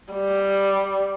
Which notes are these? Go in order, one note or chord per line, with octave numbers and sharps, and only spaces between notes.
G3